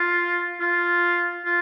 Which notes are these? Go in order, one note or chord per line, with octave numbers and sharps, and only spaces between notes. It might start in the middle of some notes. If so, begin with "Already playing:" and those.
Already playing: F4
F4
F4